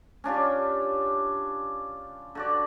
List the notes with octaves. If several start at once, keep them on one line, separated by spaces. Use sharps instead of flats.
C#4 D4 F4 G4
D3 F#4 D5